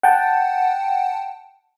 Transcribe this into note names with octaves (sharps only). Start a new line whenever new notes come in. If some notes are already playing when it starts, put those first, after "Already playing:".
F#5 G5 A5